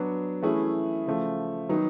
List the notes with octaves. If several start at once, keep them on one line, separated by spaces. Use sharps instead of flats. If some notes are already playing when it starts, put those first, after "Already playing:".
Already playing: F#3 B3 D4
E3 A3 C#4 E4 G#4
C#3 F3 A3
D#3 F#3 B3 D#4